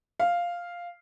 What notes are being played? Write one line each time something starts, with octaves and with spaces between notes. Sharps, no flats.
F5